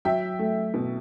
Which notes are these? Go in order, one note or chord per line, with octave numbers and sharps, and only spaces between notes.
F#3 E5 G5
A3
B2